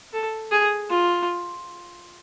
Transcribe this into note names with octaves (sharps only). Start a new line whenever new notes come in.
A4
G#4
F4